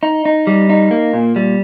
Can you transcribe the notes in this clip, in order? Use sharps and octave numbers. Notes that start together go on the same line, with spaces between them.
D#4
D#4
G3
D#4
A#3
A#2
G3